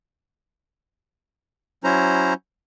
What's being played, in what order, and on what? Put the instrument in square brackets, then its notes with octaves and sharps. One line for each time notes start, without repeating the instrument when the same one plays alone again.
[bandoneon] F#3 C#4 E4 C5 A#5